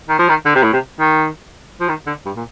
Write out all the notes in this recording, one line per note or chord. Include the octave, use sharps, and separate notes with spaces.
D#3
F3
D#3
D3
C3
A2
C3
D#3
F3
D#3
D3
G2
A#2